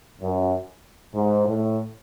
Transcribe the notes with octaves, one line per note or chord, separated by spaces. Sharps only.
F#2
G#2
A2